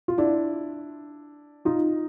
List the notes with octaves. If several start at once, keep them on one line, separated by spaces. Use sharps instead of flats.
F4
D4 E4
D#4 F4